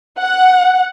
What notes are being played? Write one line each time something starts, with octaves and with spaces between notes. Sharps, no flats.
F#5